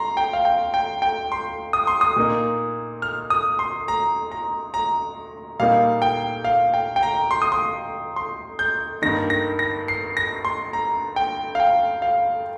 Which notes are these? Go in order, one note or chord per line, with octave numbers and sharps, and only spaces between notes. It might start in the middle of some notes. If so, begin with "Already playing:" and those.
Already playing: A#5 C6
G5
F5
G5
G5
G5
C6
D#6
C6
D#6
A#2 A#3 D#4
F6
D#6
C6
A#5
A#5
A#5
A#2 G3 A#3 D#4 F5
G5
F5
G5
G5
A#5
C6
D#6
C6
C6
G6
G2 D#3 A#3 D#4 A#6
A#6
A#6
C7
A#6
C6
A#5
G5
F5
G5
F5